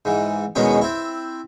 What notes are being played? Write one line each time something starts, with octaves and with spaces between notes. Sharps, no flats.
G#2 E3
E2 B2 D#3 G#3 B3 C#4
C4 E4